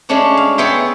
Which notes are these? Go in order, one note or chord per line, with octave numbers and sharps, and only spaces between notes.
G#3 A3 C#4 D4 F#4
F5
B3 G#4 C#5 E5 G5 C6